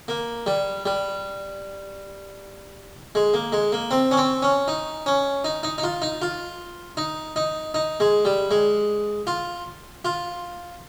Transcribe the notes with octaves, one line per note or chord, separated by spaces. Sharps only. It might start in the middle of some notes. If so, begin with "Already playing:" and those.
A#3
G3
G3
G#3
A#3
G#3
A#3
C4
C#4
C4
C#4
D#4
C#4
D#4
D#4
D#4
F4
D#4
F4
D#4
D#4
D#4
G#3
G3
G#3
F4
F4